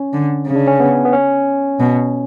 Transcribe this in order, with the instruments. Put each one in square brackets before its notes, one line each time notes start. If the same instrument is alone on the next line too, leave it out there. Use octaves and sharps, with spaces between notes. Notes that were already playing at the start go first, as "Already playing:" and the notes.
Already playing: [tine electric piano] C#4
[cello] D3
C#3
[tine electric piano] D4
C#4
B3
B3
C#4
[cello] B2